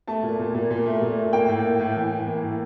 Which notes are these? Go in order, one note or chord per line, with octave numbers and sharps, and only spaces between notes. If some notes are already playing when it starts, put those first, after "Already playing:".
A3 A5
A#2
A#2
A#2
A#2
A3
A#2
A3
A#3 G5
A2
A#3
A2
E3
E3
A#3
A2